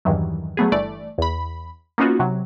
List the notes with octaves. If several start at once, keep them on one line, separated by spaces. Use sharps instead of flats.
E2 G2 D#3 E3 F#3
F#3 A3 B3 G#4
G1 E3 A3 D5
E2 B5
A#3 B3 C#4 D#4 F4 F#4
C3 F#3